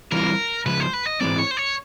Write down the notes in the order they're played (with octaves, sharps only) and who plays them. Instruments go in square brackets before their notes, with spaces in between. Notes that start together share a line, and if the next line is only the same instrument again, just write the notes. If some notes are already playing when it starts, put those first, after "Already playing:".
[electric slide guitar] E3 G3 C4 F4 [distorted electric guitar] A#4
[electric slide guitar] C#3 F3 G#3 [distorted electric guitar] B4
[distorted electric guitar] C5
B4
D#5
[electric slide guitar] G#2 E3 G#3 C4 [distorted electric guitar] D5
[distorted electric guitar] C#5
C5
C#5